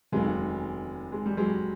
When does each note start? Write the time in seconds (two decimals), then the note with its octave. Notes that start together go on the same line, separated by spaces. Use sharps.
0.12 F1 D#2 C#3 F#3 G#3
1.12 G#3
1.26 G3
1.37 F#3 G#3